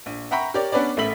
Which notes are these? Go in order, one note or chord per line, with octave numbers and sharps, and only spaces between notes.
A#1
E5 F#5 G5 A#5 B5 C#6
G4 A#4 C#5 D5
B3 C#4 D4 B4 C#5 D5
A1 A3 E5 B5 B6 F#7